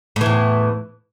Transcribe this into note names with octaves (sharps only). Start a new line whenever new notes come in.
E2 A2 E3